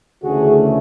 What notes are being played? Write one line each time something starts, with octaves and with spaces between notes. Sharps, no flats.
D2 C#3 E3 A3 C#4 F#4 G#4